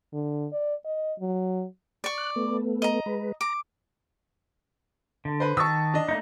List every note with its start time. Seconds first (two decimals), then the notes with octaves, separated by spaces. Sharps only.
0.13 D3
0.53 D5
0.85 D#5
1.19 F#3
2.04 D5 C#6
2.18 F#6
2.35 A3 B3
2.82 D#5 A#5
3.06 G#3 B4
3.41 A#5 D6
5.25 D3
5.40 B4 C5
5.57 D#3 A5 C#6 D#6 E6
5.94 D4 D#5
6.08 A3 A#3 D#4